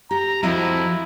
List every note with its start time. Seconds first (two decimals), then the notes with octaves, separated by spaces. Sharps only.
0.11 G4 A#5
0.43 F2 F3 E4 F#4 D#5